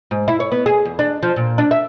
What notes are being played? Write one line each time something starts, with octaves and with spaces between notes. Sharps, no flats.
G#2
E4
C#5
B3
G#4
E2
D4
F3
A#2
D4
E5